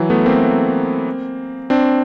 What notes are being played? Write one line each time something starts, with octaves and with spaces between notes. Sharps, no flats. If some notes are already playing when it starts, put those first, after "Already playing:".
Already playing: E3 F#3
A3 B3
A#3 C4
C4 D4